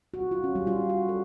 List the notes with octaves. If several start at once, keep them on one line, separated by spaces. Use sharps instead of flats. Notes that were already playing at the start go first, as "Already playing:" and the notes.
F#4
F4
C#4
G3
F4
F#4
A4